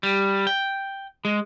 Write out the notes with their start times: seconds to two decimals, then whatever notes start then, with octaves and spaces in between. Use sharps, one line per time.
0.03 G3
0.47 G5
1.25 G#3